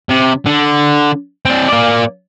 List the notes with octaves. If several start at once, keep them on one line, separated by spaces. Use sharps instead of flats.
C3
D3
C4 D4
A#3 D5